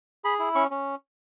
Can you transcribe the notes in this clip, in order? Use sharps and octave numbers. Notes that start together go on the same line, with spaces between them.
G#4 B5
E4
C#4 C#6
C#4